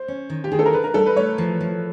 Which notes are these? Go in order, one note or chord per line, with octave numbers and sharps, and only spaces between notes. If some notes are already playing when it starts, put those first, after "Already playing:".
Already playing: C5
C#4
D#3
G4
D#3 G#4
A4
A#4
D4 B4
A#4
G3 A4
B4
A3 C#5
F3
F3